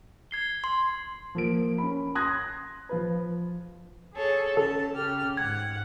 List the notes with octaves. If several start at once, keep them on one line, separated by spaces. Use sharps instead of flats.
G#6 C7 G7
C6
F3 A#3 D7
C#4 B5
C6 D#6 F#6 G#6 A#6
F3 F4 B4
G#4 A4 C#5
C#4 A4 A5
C#3 G4 F6
G#2 F#5 G#6